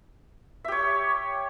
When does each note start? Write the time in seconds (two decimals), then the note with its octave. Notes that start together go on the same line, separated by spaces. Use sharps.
0.64 E5
0.68 G4
0.72 C#5